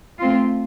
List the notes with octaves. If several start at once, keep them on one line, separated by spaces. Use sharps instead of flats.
A3 C4 F4